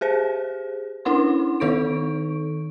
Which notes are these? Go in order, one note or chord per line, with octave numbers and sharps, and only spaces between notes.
G4 G#4 C5
C#4 D4 E4 F#5 C6
D#3 D#4 A4 C#6 D7